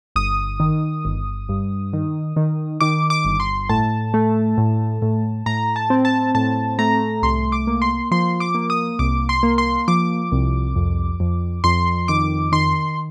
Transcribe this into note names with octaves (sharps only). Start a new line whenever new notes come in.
G1 D#6
D#3
G1
G2
D#3
D#3
D#3 D6
D6
G1
C6
A2 A5
A3
A2
A2
A2 A#5
A5
C4
A5
A2 A5
A3 A#5
C2 C6
D6
A#3
C6
F3 C6
D6
A#3
D#6
C2 D6
C6
A#3
C6
F3 D6
C2
F2
F2
F2 C6
D#3 D6
D#3 C6